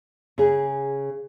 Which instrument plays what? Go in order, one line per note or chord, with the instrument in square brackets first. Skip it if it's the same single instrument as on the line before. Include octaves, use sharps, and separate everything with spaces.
[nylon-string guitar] C#3 G#4